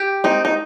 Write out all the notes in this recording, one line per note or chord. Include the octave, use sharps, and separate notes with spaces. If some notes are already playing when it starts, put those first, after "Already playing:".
Already playing: G4
C4 D#4
D#4